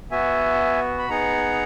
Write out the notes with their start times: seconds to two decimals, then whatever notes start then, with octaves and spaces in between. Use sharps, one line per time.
0.11 B3 F#4 E5 G#5
0.99 B5
1.09 B3 D#4 G#4 F#5 A#5